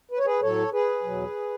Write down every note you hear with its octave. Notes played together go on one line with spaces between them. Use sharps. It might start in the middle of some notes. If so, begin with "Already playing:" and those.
B4
C#5
G#4 B4
A2 F#3 A4 C#5
G#4 B4
E2 B2 F#3